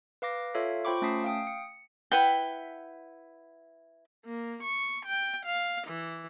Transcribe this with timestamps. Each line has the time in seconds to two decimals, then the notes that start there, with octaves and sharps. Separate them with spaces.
0.22 B4 F5 D6 A#6
0.54 F4 A4 C#5 E5 F5
0.85 F4 C5 G5 B5 C#6 D6
1.02 A3 C#4 A5 D#6 B6 C7
1.24 F5 G5 D#6
1.47 C#7
2.12 E4 B4 F#5 G5
4.25 A#3
4.63 C#6
5.06 G5
5.46 F5
5.87 E3